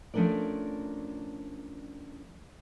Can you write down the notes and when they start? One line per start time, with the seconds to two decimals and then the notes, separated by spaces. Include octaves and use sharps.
0.14 F3 A3 C#4 D4 A#4 D5